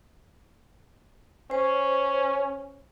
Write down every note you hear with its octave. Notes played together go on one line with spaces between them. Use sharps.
C#4 C5